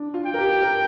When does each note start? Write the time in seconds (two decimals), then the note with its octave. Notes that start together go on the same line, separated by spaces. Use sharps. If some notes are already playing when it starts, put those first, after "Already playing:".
Already playing: D4
0.14 F4
0.26 G5
0.34 A#4
0.38 G4
0.53 G4
0.62 A#4